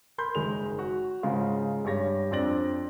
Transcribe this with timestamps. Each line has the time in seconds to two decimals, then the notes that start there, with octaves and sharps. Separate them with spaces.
0.18 A#4 B5 C6 G6
0.35 F#1 D#3 G#3 F7
0.79 F#4
1.23 G#2 C#3 G#3 F4
1.85 G2 G4 C#5 A#6
2.31 F2 C4 D4 D5 A#6 F#7